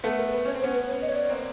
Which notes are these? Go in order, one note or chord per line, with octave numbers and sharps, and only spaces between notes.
A3 B3 A4
A#4
B4
C#4 C#5
C4
C5
B3 C#4
B4
C#5
D#5
C#5
D5
A#3 C4